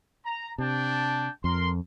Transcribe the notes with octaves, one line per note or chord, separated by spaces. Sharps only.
A#5
C3 D4 G5 A5
F2 A#4 C6